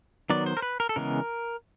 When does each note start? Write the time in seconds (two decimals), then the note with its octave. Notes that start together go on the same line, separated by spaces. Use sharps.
0.30 D#3 F#3 B3 D5
0.46 C5
0.57 A#4
0.62 B4
0.80 A#4
0.89 A4
0.96 C#3 E3 G#3 B3 A#4